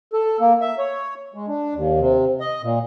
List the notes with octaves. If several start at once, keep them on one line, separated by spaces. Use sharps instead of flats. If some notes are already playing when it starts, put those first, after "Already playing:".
A4
A#3
E5
C#5
G#3
D4
D#2
C3
D#5
A#2